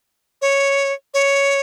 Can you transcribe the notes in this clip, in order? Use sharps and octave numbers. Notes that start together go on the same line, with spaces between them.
C#5
C#5